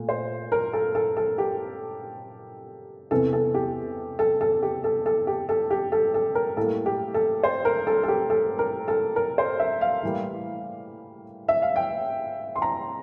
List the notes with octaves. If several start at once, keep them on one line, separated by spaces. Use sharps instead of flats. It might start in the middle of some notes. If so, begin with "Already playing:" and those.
Already playing: A#2 A3
C5
A#4
A4
A4
A4
G4
E2 C3 E3 A4
A4
G4
A4
A4
G4
A4
A4
G4
A4
G4
A4
A4
A#4
A2 G3 A#3 A4
G4
A4
C5
A#4
A4
A4
G4
A4
A#4
A4
A#4
C5
E5
F5
A2 E3 G3 A#3
E5
F5
G5
C6
A#5